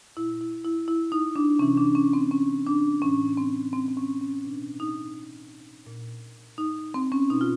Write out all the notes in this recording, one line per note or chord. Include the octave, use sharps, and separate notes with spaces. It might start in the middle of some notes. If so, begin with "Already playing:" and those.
A#2 E4
E4
E4
E4
D#4
D4
C3 E3 C#4
D4
C#4
C4
C#4
D4
A2 E3 C#4
C4
C4
C4
C#4
C#4
B2 D4
D#4
A#2
D#4
C4
C#4
B2 D#4
F4